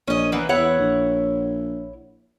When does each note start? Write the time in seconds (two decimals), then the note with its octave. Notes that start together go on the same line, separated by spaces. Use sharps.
0.08 A#1 C#4 D#5
0.32 E3 A#3 B3
0.49 E2 E4 C#5 F#5
0.79 A#1